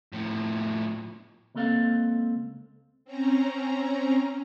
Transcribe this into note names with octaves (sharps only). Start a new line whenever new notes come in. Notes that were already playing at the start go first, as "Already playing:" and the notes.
A2 F3
C#2 A#3 C4 A4 F5
C4 C#4 A#5